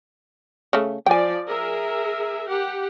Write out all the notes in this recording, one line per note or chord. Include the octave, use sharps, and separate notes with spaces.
C#3 A3
F3 D5 G5 G#5
G#4 A#4 E5
G4 F#5